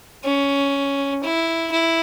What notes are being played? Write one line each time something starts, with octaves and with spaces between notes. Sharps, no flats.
C#4
E4
E4